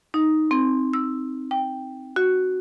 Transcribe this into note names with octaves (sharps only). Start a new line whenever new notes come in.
D#4
C4
E6
G5
F#4